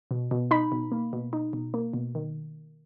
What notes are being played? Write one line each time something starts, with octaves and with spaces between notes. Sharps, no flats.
B2
B2
D#4 B5
B2
A#3
B2
D#4
B2
A#3
B2
D#3